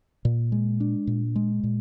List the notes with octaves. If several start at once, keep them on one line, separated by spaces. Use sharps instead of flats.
A#2
G#3
D4
A#2
G#3
A#2